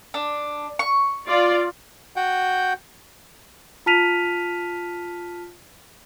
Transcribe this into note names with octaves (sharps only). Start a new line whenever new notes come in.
D4
C#6
F4 D5
F#4 F#5 G5 G6
F4 A5 F6 B6 D#7 F7